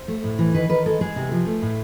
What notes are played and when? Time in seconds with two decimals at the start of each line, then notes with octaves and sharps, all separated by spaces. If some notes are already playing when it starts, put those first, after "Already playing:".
Already playing: C5
0.08 A3
0.24 A2
0.39 E3
0.54 D#3 B4
0.69 D#3 B4
0.86 G#3 A4
1.01 G#3 G#4
1.16 C3
1.32 F3
1.46 A3
1.62 A2